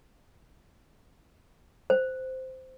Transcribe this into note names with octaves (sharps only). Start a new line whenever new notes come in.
C5